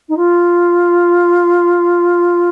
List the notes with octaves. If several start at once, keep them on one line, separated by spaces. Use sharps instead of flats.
D#4
F4